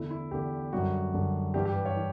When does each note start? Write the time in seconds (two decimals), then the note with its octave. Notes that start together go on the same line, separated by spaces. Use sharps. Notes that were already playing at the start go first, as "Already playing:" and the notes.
Already playing: E2 D3 A3 E4
0.10 E4
0.31 E2 D3 A3 G4
0.73 F#2 D3 G3 F#4
1.14 F#2 D3 G3
1.54 G2 E3 G3 G4
1.65 G4
1.76 B4
1.85 C#5
1.97 E3